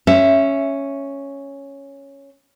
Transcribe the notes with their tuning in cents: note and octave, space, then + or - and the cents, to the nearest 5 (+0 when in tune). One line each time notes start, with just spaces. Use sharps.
C#4 +0 E5 +10